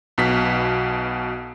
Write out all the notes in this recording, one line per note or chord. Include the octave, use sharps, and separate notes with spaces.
B1 B2 B6